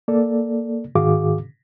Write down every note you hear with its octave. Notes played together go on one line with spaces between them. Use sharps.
A#3 A4 D5
G#2 D#3 F#4 G#4 F5 D6